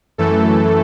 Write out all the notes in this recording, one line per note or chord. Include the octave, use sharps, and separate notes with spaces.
F#2 E3 A3 A4